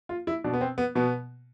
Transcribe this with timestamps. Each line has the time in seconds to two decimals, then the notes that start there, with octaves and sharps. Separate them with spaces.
0.09 F4
0.27 E4
0.44 B2 D4
0.53 B3
0.61 C4
0.78 B3
0.95 B2 B3